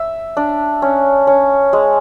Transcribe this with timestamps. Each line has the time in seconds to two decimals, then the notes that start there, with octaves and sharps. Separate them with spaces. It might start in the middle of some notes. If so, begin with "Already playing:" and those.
Already playing: E5
0.37 D4
0.82 C#4
1.27 C#4
1.73 G#3